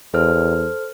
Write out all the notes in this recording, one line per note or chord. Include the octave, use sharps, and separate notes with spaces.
E2 A4 C5 F6